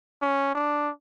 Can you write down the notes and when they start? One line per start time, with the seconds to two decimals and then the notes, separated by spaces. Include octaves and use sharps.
0.22 C#4
0.55 D4